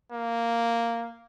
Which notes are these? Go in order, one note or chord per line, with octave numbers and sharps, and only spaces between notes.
A#3